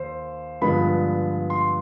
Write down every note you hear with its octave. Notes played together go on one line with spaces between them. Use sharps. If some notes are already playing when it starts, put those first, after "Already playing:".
Already playing: D#2 C5
G2 D3 F3 G#3 B3 B5
C6